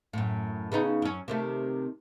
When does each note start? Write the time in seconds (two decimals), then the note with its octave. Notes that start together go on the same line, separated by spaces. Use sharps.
0.13 F#2 A2
0.72 C#3 B3 D#4
1.02 F#2 C#4
1.28 C3 D#3 A3